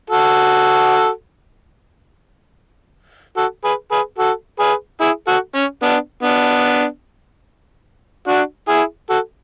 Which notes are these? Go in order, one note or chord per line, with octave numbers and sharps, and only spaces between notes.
F#4 A4
F#4 A4
G#4 B4
G#4 B4
F#4 A4
G#4 B4
E4 G#4
F#4 A4
C#4
B3 D4
B3 D4
D4 F#4
E4 G#4
F#4 A4